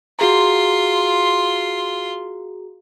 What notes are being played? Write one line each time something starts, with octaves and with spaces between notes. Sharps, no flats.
F4 F#4 G#4 A#5 C6